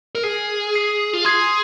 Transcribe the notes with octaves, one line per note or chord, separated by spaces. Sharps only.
A#4
G#4 G#5 F6 C7 D#7
D#6 C7 D#7
F4
G#4 C6 G#6 C7